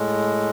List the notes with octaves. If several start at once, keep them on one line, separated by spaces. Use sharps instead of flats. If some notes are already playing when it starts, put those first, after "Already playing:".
Already playing: A2 G#3